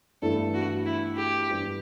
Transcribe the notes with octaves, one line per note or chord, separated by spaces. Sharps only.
G2 E3 A3 E4 A4
F#4
E4
G4
G2 E3 G3 D4 G4